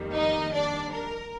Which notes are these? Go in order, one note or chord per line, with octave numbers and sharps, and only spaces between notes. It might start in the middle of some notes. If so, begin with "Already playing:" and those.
Already playing: F2 D#3 G3 A#3
D#4 D#5
D4 D5
A#4